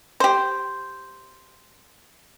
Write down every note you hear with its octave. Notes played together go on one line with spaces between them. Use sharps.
G4 C5